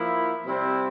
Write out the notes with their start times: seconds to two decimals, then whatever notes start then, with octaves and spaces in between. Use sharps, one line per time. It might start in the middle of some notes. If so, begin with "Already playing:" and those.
Already playing: F3 A#3 E4
0.44 C3 G3 C4 E4